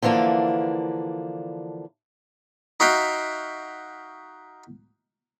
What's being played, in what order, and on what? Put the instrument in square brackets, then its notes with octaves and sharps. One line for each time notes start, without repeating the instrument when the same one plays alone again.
[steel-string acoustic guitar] D3 E3 F3 A#3 D4
[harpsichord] D#4 F#4 E5 F5 G5